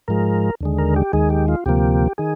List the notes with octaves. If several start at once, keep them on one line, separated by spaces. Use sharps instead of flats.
G#2 F3 G#3 A#4
D#2 D3 G#3
A#4
G4
D#2 D#3 G#3 G#4
G4
F4
D2 C3 F3 A#3 G4
D#3 G#4